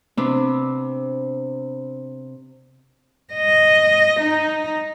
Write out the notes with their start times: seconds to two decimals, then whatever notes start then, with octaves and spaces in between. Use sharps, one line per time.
0.17 C3 B3 C4 D4
3.34 D#5
4.20 D#4